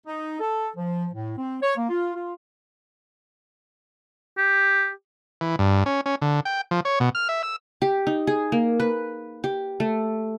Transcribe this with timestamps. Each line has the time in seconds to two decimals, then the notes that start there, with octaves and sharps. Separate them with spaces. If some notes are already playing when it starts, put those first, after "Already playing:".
0.06 D#4
0.39 A4
0.76 F3
1.12 A2
1.37 C4
1.61 C#5
1.77 A#3
1.89 F4
2.14 F4
4.38 G4
5.41 E3
5.59 G2
5.86 C#4
6.06 C#4
6.22 D3
6.45 G5
6.71 F3
6.85 C#5
7.00 B2
7.15 F6
7.29 E5
7.43 E6
7.82 G4
8.07 D#4
8.27 G#4
8.52 A#3
8.80 B4
9.44 G4
9.80 A3